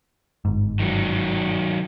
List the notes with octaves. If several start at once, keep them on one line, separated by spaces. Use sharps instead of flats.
G1 G#2
D#3 F#3